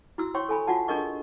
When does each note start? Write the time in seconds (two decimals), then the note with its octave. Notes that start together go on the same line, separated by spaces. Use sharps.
0.18 E4 F#4 E6
0.34 C#5 G5 C6 C#6
0.49 A4 G#5 B5
0.67 F4 F#4 F#5 A5
0.88 D4 G#4 A#4 D#5 C#6